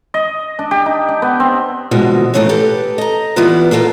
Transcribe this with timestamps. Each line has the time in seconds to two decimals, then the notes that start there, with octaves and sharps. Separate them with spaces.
0.14 D#5
0.59 D4
0.71 G4
0.86 D#4
1.08 D4
1.22 B3
1.40 C4
1.91 B2 D3 E3 F3 G#3 A#3
2.34 A2 C#3 E3 A3 A#3
2.49 G4 A4 B4
2.98 D#5 A#5
3.36 E3 G3 B3 E4 F4 B4
3.71 B2 A#3 F4 A4 F5